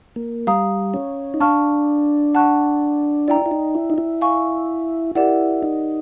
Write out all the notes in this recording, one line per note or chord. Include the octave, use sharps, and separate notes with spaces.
A#3
G3 F5 A#5 D#6
C#4
D#4
D4 F5 A5 C#6 F6
F#5 A5 C#6 F#6
E4 D5 G5 A#5
E4
D#4
E4
D#4
E4
F5 G#5 C#6
E4 G4 A#4 D5 F#5
D#4